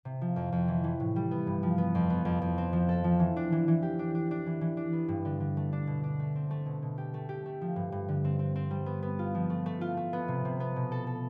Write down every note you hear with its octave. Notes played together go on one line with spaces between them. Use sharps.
C3
F3
F2
F2
E3
E3
A2
G3
B3
G2
F3
B3
F2
B3
F2
F2
C4
F3
A4
F3
E3
D4
E3
E3
G4
D4
D4
D4
E3
E3
D4
B3
G2
D3
D3
A3
D4
B2
D4
A3
C4
A3
B2
B2
G4
A3
G4
A3
F3
G2
G2
D3
C4
C4
C4
G3
B3
B3
F4
F3
A3
A3
F4
A3
B3
C3
C3
B3
B2
A4
A4